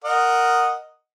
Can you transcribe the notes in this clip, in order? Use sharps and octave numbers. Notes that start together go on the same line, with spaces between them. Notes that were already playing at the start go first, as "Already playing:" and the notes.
A#4 D#5 F#5